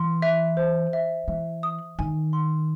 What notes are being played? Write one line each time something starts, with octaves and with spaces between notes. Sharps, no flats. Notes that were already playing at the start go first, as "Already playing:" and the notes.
Already playing: E3 C6
E5
C5
E5
E3 E5
D#6
D#3 G#5
C6